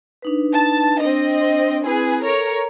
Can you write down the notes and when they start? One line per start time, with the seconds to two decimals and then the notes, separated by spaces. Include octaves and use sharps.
0.22 D4 D#4 B4
0.55 A5
1.00 C4 D4 D#5
1.85 C4 E4 G#4 B4
2.24 A4 A#4 C#5 A#5